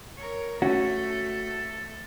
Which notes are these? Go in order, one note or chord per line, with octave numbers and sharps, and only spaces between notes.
A#4 C#5
A3 C#4 F#4 A4